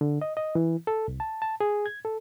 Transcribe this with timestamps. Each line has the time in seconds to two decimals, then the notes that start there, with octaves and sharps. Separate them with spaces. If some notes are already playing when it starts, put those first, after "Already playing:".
0.01 D3
0.21 D#5
0.37 D#5
0.55 E3
0.87 A4
1.08 C2
1.20 A5
1.42 A5
1.61 G#4
1.86 G#6
2.05 A4